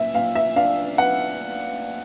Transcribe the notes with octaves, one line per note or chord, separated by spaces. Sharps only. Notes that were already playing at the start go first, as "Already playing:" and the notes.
Already playing: A#2 E5
A#2 F5
E5
D4 F5
B3 F#5